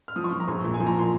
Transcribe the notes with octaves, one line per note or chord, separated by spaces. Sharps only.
F6
F3 D#6
C#6
F3
A#5
A#1 C#6
A#2
G#5
F3
A#5
A#2 C6